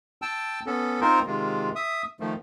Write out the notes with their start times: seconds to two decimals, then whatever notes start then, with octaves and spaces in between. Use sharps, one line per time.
0.22 G5 A5 E6
0.66 B3 C#4 A4
1.01 C4 D#4 F4 A#4 C5
1.27 C3 D#3 G#3 F4
1.75 E5 D#6
2.20 D#3 F3 A3